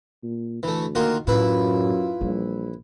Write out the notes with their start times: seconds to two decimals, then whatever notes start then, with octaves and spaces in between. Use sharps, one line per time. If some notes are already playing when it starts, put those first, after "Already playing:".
0.23 A#2
0.63 D2 E3 A3
0.95 D#3 A#3 F4 F#4
1.27 F#2 A2 E4 F4 B4
2.21 A#1 E3 G3